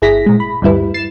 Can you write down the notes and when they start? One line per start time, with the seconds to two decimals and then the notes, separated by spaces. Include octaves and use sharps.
0.02 G1 E4 G#4 A#6 B6
0.26 A#2 G#3
0.40 B5
0.62 D2 G2 G3 E4 B4
0.94 A6 C7 E7